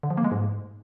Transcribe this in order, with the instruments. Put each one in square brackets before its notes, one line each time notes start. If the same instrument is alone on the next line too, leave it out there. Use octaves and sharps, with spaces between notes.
[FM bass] D3
F3
A#3
G#3
G#2